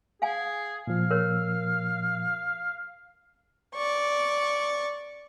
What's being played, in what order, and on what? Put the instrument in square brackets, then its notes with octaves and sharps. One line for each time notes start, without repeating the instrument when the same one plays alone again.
[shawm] G#4 [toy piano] F5 F#5 G#5
[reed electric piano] A#2 F3 [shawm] F5
[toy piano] A#4 C#5
[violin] D5 C#6